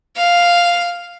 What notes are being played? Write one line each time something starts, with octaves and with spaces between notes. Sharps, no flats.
F5